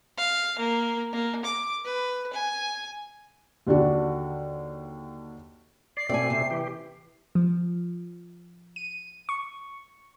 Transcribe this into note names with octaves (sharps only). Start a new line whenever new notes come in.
F5
A#3
A#3
D6
B4
G#5
D#2 D3 D4 F#4
D5 C7
B2 A3 C4 D5 G#5
C3
E3 G4
F3
D#7
C#6